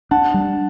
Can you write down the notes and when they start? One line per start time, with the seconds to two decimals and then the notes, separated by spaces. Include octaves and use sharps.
0.11 D4 F#5 A5
0.34 G3